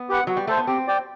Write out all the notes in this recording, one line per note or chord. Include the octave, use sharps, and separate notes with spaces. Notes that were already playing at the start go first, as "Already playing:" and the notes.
Already playing: B3
G4 B4 F#5
F#3 F#4
G3
A3 A4 C5
B3
C4 G4
D5 G5